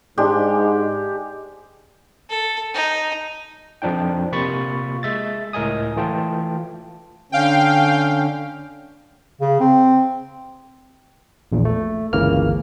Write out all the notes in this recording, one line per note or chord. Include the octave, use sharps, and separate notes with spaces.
G#2 G#3 D4 G4
A4
D#4
F2 F3 D4 D#4 G5
C3 A#3 F4 B5 C#6 A6
G#3 E5 A6
C#2 A2 A#4 D#5 G#5 D#6
E3 A3 F4 G5 A5
D3 C#4 F5 G5
C#3
C4
A#1 E2 A#2
A3
G1 C#2 C#3 E3 A#3 F6